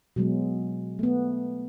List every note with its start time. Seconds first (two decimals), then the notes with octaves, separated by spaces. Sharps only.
0.16 B2 F#3 G#3
0.99 A3 B3